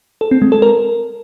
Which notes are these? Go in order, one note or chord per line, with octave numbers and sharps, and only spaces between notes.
A4
C4
G#3
A4
A#4